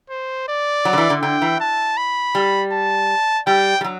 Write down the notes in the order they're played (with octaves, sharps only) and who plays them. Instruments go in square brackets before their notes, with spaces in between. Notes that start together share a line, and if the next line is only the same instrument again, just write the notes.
[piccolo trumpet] C5
D5
[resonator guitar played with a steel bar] F#3
D3
E3
D3
[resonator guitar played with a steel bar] D3 [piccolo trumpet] G5
[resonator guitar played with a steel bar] E3
[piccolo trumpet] A5
B5
[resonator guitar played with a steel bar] G3
[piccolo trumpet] A5
[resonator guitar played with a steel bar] G3 [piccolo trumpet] G5
[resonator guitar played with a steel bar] G3
F#3